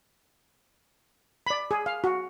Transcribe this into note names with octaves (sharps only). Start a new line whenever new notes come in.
D5 B5
G#4
F5
F#4